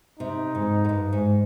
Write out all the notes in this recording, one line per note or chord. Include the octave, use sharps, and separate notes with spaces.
C3 D#4
G#2
G#2
G2
G#2